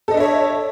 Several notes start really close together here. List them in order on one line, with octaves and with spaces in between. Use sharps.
A4 D#5 D4 E5 C#5